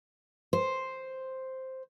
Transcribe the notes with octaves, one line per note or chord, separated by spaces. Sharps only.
C5